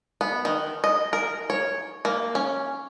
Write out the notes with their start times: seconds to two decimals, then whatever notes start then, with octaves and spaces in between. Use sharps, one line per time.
0.21 B3
0.45 D#3
0.84 D#5
1.13 A#4
1.50 C#5
2.05 A#3
2.35 C#4